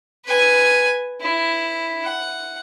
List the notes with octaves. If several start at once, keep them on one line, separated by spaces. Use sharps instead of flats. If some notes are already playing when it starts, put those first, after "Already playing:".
B4 G#5
E4
F#5